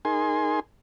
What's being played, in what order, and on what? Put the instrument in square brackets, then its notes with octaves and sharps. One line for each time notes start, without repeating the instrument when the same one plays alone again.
[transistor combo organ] D#4 G#4 A#4 G#5 C6